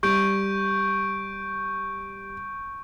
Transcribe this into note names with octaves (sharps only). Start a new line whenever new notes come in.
G3 C#6 G6 D7